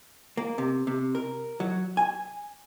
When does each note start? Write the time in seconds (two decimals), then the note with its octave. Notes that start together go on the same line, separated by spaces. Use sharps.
0.37 A#3
0.58 C3
0.87 C3
1.15 A#4
1.60 F#3
1.97 G#5